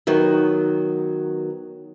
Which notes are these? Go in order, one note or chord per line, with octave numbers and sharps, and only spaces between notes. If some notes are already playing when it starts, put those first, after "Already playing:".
D#3 F#3 B3